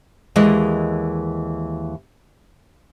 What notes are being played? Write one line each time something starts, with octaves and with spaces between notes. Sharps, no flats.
D#2 E3 G#3 D#5